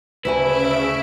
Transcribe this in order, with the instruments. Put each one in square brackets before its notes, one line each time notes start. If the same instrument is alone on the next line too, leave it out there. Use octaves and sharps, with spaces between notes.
[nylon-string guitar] D2 F#4 G#5 [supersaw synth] C#3 E5 D7 [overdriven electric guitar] E4 [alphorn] B4